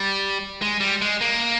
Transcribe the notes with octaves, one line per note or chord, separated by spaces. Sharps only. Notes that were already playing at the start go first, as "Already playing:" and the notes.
Already playing: G3
G#3
G3
G#3
A#3